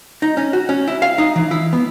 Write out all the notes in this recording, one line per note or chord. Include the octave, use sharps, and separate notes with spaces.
D#4
C#4
F#4
C#4
E4
F5
D#4
E3
E4
B3